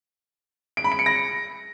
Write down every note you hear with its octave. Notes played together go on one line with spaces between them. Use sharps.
D7
B5
D7
C#7
A#6